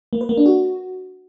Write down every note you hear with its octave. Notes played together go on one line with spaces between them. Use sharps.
A#3
B4
A#3
D4
F#4